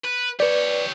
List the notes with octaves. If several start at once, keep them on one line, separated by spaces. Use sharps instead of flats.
B4
G4 B4 C#5 D5